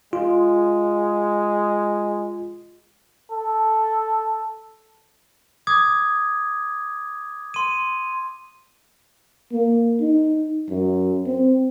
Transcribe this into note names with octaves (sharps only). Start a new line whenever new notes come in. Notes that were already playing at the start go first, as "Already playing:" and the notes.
G#3 F4
A4
D6 D#6 G#6
C6 D#7
A#3
D#4
F#2
C4